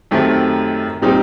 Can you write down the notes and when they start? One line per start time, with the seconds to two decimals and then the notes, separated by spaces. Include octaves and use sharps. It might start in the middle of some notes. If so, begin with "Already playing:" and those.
0.11 F#2 D#3 A3 C4 G4
1.02 A#2 G3 C4 D#4 G4